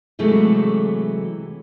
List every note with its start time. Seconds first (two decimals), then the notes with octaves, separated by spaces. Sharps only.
0.19 C3 E3 F#3 G#3 A3